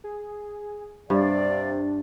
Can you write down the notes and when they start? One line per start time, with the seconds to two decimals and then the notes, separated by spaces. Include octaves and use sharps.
0.04 G#4
1.10 G2 C3 D4 D5 F5